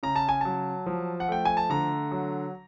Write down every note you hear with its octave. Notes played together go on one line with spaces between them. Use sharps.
C#3 A#5
A5
G#5
F#3 A5
F3
F#5
A3 G5
G#5
A5
D3 A#5
F#3